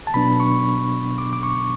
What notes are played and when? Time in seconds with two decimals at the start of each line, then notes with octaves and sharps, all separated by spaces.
0.07 A5
0.14 B2 F#3 B3 D4 B5
0.40 C#6
1.18 D6
1.33 D6
1.43 C#6